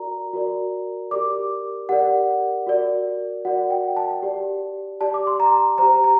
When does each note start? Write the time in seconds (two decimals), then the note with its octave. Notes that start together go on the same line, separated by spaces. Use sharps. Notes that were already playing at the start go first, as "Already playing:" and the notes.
Already playing: F#4 A#4 D5 A#5
0.33 F#4 A#4 D5
1.11 G4 A#4 D5 D6
1.89 G4 A#4 D5 F#5
2.67 F#4 A#4 D5
3.45 F#4 A#4 D5 F#5
3.70 G5
3.96 A5
4.23 G4 D5
5.01 G4 D5 A5
5.14 D6
5.27 C6
5.40 A#5
5.78 G4 C5 A#5
6.04 A#5